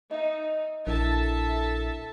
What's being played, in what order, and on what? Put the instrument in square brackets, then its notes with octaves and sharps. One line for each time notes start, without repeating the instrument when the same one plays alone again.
[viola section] D#4 [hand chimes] D#5 E5
[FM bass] A#1 [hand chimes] D4 E4 A#4 [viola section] A4 E5 A5